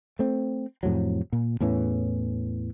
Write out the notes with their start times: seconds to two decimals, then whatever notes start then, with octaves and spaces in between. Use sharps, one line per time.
0.19 A3 C4
0.83 F2 A2 C3 F#3
1.33 A#2
1.61 E2 A2 E3 C#4